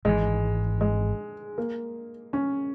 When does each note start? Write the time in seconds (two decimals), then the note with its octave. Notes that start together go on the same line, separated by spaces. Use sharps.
0.05 G#1 G#2 E3 G#3
0.81 G#3
1.58 A#3
2.33 C#4